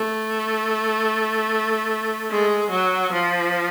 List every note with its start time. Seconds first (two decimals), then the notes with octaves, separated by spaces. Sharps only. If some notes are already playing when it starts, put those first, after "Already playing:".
Already playing: A3
2.31 G#3
2.71 F#3
3.12 F3